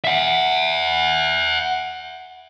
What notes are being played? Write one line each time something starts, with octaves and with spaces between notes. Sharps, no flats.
E5 F#5